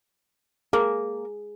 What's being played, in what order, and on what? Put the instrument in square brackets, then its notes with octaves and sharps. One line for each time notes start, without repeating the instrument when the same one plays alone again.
[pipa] A#3 [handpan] G#4